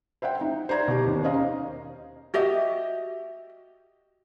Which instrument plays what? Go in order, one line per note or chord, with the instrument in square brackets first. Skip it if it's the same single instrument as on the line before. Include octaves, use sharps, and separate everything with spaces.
[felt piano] C5 E5 F#5 G5
D#4
C5 D5 A#5 G#6
B2 G4
D#2
C#4 C5 D#5 F5 A#5
[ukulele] F#4 G4 D#5 E5